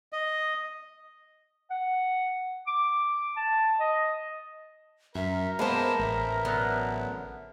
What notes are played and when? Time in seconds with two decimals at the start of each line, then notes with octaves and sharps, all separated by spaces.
0.13 D#5
1.70 F#5
2.67 D6
3.36 A5
3.80 D#5
5.15 F#2 A#4 E5
5.59 G#3 A#3 B3 B4 C5 A5
6.00 A1 E5
6.45 D3 F#3 B3